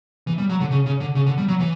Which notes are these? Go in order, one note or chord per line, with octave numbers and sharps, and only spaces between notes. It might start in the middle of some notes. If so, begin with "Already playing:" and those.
E3
G3
F#3
D3
C#3
C#3
D3
C#3
D3
G3
F#3
E3